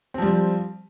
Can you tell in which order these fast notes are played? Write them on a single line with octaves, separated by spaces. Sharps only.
C4 F3 G3